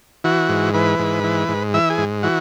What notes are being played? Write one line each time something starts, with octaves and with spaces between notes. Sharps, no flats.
E3 F#4
G#2
E3 B4
G#2
E3
G#2
E3 E5
G#4
G#2
E3 F#4